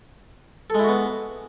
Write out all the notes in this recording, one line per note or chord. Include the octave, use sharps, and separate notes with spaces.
G#3 B3 E4 F#4 A4